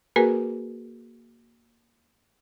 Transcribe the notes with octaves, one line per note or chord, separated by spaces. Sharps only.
A#3 F#4 G#4 A#4 B4 G#5